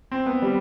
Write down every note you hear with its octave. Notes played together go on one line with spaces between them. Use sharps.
C4
B3
G3